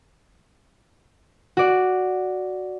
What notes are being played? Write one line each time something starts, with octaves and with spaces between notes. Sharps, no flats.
F#4 D5